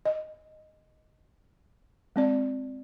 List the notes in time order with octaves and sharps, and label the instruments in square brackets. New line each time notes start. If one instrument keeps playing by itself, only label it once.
[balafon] D#5
G#3 C4 D5